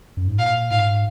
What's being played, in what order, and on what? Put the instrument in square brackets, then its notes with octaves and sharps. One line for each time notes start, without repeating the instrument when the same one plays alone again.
[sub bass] F#2
G#2
[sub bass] A#2 [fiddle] F5
[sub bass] G#2 [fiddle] F5